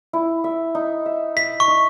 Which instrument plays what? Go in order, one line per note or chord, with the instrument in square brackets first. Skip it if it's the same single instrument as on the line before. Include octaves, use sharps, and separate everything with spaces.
[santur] E4
E5
D#4
E5
[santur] E5 [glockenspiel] B6
[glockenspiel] C#6
[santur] D#4